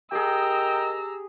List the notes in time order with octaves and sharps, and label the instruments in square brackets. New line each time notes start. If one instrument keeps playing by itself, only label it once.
[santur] G4 G#4 [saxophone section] A#4 D#5 [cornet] G5 [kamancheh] A#5 E6